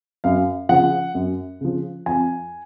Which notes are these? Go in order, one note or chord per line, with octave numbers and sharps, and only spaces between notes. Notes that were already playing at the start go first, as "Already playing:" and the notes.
F#2 F5
C#3 F3 F#5
F#2
C#3 F3
F2 G#5